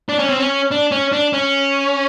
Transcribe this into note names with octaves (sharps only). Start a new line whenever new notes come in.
D4
C#4
C4
C#4
D4
C#4
D4
C#4